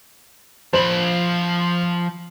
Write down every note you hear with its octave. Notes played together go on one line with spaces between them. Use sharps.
F3 C5 B5